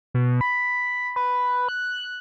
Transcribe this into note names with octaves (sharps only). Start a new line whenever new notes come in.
B2
B5
B4
F#6